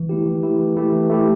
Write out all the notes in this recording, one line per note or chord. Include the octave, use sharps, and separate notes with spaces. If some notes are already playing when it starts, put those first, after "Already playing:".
Already playing: E3
A3 E4 G4
E3
A3 E4 G4
E3
A3 E4 G4
E3
A3 E4 G4